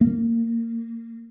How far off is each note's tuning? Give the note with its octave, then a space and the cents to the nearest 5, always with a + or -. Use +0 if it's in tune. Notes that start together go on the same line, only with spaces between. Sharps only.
A#3 -25